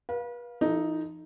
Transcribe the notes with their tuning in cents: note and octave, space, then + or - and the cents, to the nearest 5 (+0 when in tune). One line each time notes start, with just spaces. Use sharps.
B4 -35 F5 +10
E3 +45 D#4 +0 A4 +0